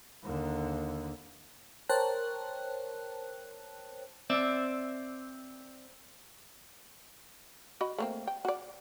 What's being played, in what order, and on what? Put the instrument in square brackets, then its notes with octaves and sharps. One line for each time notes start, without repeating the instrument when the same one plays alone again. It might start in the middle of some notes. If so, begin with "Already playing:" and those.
[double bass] D#2 D3
[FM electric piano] A#4 C5 C#5 G5 A5 F#6
[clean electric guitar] C4 D5 E5
[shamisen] F#4 D#5 B5
A3 A#3 C4
G5
F#4 D5